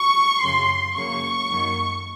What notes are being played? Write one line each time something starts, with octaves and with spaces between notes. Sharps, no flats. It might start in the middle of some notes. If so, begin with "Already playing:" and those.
Already playing: C#6
F#2 C#3 F#3 C6
F#2 C#3 F#3 A#3 C#6
F#2 D#3 F#3 A#3